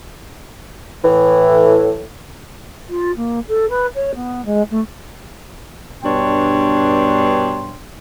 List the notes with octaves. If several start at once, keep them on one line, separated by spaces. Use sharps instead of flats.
A2 E3
F4
A#3
A4
B4
C#5
B3
G#3
A3
G2 B2 D4 C#5 G5 C6